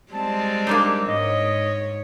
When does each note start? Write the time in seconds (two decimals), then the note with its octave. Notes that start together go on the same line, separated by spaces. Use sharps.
0.12 G3 G#3 C4 A5
0.67 A#3 D4 D#4
1.06 G#2 C#5 D#5